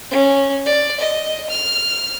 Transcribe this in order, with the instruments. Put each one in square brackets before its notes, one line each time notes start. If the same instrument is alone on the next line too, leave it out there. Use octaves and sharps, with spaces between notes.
[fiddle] C#4
D5
D#5
F6